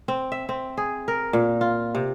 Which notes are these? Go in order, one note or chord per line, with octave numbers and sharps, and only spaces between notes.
C4
E5
C4
G#4
A#4
A#2
F4
C3